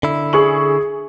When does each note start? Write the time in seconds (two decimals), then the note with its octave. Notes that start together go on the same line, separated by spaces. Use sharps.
0.03 D3 E4
0.33 G#4 C#6 F#7